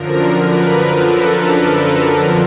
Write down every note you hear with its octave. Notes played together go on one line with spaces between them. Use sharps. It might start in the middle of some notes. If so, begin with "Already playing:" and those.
Already playing: F#2 D3 F3 A#4
B4
A4
F2 D3 F3 A#4